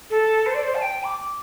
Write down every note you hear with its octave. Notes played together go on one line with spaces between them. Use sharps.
A4
C5
D5
C5
A5
G5
D6